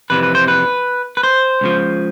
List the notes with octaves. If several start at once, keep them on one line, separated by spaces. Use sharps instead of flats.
F2 C3 E3 B4
B4
C5
B4
B4
C5
C#2 C#3 F3